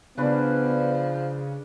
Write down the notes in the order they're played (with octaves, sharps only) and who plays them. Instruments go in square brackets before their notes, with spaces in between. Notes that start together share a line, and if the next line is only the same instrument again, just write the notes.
[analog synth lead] C#3 [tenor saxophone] F3 [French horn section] B3 [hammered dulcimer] D4 B4 D5